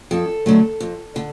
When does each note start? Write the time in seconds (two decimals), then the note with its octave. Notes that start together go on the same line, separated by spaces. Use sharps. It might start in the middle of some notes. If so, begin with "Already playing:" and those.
0.11 F2 A4
0.46 D3 F#3 A3
0.80 F2
1.16 D3